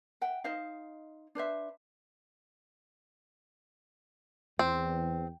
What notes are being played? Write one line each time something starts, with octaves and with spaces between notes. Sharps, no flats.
E5 F#5 G5
D#4 C5 D#5 F5
D4 B4 C5 E5
E2 C4